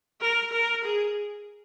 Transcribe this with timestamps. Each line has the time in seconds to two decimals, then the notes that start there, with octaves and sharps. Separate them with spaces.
0.21 A#4
0.53 A#4
0.84 G#4